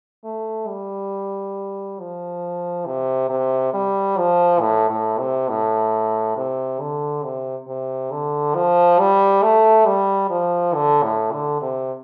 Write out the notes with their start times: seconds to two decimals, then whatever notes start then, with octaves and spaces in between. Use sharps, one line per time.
0.24 A3
0.68 G3
2.00 F3
2.86 C3
3.30 C3
3.73 G3
4.17 F3
4.61 A2
4.90 A2
5.19 C3
5.49 A2
6.37 C3
6.80 D3
7.24 C3
7.68 C3
8.11 D3
8.55 F3
8.99 G3
9.43 A3
9.86 G3
10.30 F3
10.74 D3
11.03 A2
11.32 D3
11.62 C3